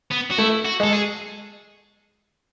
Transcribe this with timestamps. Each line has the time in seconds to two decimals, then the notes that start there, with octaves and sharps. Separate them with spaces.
0.11 B3
0.31 F#4
0.38 A3 E4
0.65 F#4
0.80 G#3 A4
0.93 G#4